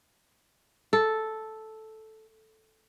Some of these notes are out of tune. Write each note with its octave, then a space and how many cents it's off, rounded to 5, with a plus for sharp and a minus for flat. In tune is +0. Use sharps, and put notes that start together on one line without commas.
A4 -5